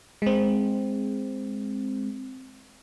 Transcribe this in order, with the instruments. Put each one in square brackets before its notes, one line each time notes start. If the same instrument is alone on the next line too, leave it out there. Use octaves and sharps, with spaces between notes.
[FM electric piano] G#3 C4